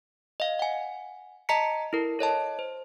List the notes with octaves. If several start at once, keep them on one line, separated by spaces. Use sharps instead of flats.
D#5 F5
F#5 G#5
D#5 A5 A#5 B6 C#7
E4 A4 A#4
A4 C#5 D#5 A5
C5